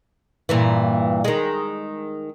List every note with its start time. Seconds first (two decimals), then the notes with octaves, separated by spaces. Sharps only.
0.49 G2 A#2 E3
1.24 D#3 G#3